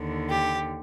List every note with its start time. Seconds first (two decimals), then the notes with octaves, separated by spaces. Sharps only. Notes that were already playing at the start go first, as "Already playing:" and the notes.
Already playing: D#2 D3
0.29 G4